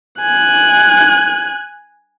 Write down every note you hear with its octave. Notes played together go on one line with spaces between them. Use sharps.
G#5 F#6